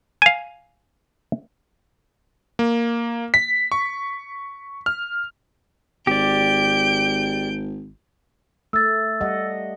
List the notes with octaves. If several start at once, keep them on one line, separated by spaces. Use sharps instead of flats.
F5 G#5
A#3
B6
C#6
F6
G#1 G4 D5 G6 D7
A3 E6 A6
G3 D#5 F#5